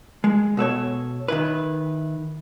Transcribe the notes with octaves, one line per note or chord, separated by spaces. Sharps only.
G#3
B2 A4 B4 C#5
D#3 E4 B4